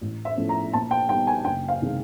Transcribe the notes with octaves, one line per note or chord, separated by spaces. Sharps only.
A1
E5
A2 F3 A3 C#4
A#5
A#2 A5
G5
G3 B3 D#4 G5
G#5
F#1 G5
F5
C3 D#3 G#3